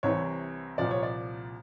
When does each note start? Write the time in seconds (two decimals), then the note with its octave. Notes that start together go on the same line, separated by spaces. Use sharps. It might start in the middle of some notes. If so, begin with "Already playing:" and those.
0.03 C2 C3 E3 C#5
0.78 C2 A#2 F3 D5
0.91 C#5
1.03 D5